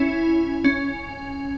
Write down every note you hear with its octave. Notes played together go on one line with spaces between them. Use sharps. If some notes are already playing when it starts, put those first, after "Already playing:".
Already playing: C#4 E4
C#4